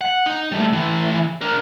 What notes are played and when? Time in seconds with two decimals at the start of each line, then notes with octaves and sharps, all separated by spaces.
0.01 F#5
0.26 D#4
0.52 G3 A3
0.73 A2 E3
1.41 D4 A#4